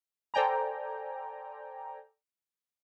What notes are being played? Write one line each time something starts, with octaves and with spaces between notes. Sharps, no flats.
A4 C5 D5 G5 G#5 A#5